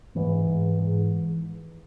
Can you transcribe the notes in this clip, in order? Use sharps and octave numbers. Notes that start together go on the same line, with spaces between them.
G#2 E3
G#2
G#2